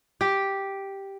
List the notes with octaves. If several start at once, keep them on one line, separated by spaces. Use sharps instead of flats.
G4